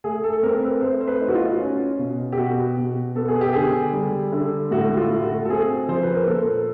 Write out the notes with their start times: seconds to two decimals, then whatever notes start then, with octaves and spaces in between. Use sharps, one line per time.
0.04 A3 G#4
0.24 A4
0.43 C4 A#4
0.63 B4
0.82 A3 C5
1.01 C5
1.07 B4
1.21 D#4
1.28 F#4
1.35 F4
1.60 C#4
1.98 B2
2.32 G4
2.37 B2 F#4
2.77 B2
3.15 B3 A4
3.28 G#4
3.41 G4
3.53 D3 G#4
3.93 G3
4.32 D3
4.71 A2 F#4
4.97 F4
5.10 A3
5.23 F#4
5.45 A4
5.49 C4 G#4
5.88 F3 C5
6.03 B4
6.15 A#4
6.27 A#2 A4